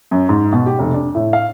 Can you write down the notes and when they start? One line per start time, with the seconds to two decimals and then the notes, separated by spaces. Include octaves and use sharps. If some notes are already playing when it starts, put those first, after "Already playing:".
0.11 F#2
0.29 G#2
0.52 B2
0.66 G4
0.79 F1
0.94 D4
1.15 A2
1.33 F5